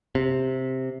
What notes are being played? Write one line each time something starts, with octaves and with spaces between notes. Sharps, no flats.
C3